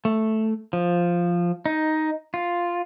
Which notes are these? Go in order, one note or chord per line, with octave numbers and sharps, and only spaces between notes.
A3
F3
D#4
F4